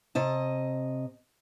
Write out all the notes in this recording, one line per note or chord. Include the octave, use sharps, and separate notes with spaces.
C3 D#5 A5